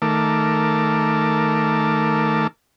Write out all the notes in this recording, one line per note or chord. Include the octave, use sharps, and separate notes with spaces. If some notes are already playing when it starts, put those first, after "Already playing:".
D#3 A3 A#4 A5 D6